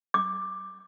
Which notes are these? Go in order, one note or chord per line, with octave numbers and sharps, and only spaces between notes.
D6